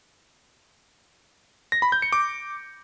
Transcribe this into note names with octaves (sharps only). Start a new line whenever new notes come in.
A#6
B5
G6
C#7
D6